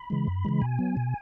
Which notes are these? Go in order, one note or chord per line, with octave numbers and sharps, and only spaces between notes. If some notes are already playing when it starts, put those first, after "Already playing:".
Already playing: B5
C#3 E3 G#3
F#2
C#3 E3 G#3
B2 G#5
F#3 B3
B2